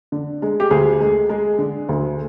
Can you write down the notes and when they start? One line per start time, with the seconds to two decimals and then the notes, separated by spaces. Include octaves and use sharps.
0.12 D3
0.42 G#3
0.60 G4
0.71 D2 G#4
1.00 G#3
1.29 G#3
1.58 D3
1.89 D2